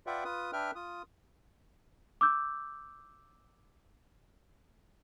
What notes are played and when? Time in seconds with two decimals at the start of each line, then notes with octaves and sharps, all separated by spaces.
0.07 F4 B4 D5 E5 F#5 G5
0.25 F4 B4 D#6
0.53 D4 B4 E5 G5 F6
0.75 F4 D#6
2.21 D6 E6 G6